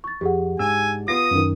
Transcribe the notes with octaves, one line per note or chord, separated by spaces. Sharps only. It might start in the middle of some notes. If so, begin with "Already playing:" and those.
C#6 A6
F2 G4 G#4 F#5
G#2 D4 G#5 E6
B3 F4 D#6 A#6
F#2 D#3